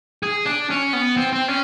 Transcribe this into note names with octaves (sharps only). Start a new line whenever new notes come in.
G#4
D4
C#4
B3
C4
C4
C#4